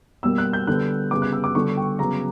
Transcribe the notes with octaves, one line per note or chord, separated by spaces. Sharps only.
B2 G3 A#3 E6
F#6
G6
D3 G3 B3 F#6
C#3 G3 B3 D6
F#6
E6
D6
D3 G3 B3 C#6
G5
C#3 F#3 B3 A#5